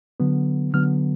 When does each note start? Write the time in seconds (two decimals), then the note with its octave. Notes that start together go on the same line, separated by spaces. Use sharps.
0.20 D3 F#3 B3
0.73 D3 F#3 B3 F6